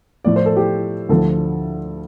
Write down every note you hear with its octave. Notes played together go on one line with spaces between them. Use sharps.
A2 F3 D5
C5
A4
G4
D2 D3 F3 A4